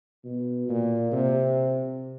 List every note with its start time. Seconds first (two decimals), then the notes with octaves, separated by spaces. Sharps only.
0.25 B2
0.69 A#2
1.12 C3